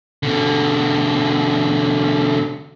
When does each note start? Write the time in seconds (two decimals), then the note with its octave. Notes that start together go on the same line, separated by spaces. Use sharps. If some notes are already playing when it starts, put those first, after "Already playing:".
0.23 B2 D3